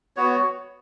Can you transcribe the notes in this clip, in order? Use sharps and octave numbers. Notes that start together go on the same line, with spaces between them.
B3 F#4 C#5